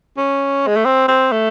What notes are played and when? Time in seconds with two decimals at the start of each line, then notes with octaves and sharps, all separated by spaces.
0.17 C#4
0.67 G#3
0.76 A3
0.85 C4
1.08 C4
1.32 A3